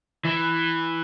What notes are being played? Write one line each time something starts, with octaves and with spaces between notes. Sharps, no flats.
E3